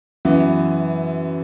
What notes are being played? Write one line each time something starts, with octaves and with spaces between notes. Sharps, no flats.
F#2 E3 B3